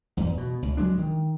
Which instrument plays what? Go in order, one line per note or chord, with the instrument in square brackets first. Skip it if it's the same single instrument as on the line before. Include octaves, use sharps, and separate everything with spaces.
[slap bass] E2 G#2
B2
C#2
F#3 G#3 D4
D#3